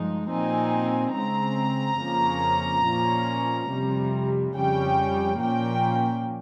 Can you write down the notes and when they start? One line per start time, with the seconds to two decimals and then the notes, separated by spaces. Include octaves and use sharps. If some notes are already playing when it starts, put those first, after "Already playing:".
Already playing: G2 F3 G#3 D#4
0.29 A#2 F3 C4 D#4 G#5
1.14 C#3 G#3 C4 A#5
2.00 F2 C#3 F3 A#3 C#4
2.85 A#2 F3 A#3 C#4
3.70 F2 C3 G3
4.55 F2 C#3 G3 C#4 G5
5.41 A#2 F3 A#3 C#4 G5